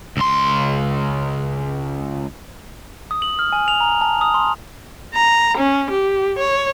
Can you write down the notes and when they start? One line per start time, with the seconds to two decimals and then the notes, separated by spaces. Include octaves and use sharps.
0.17 C#2 C6
3.11 D#6
3.22 F#7
3.39 F6
3.53 G#5
3.68 F7
3.81 A#5
4.01 A5
4.21 D#6
4.34 C6
5.14 A#5
5.58 C#4
5.91 G4
6.39 C#5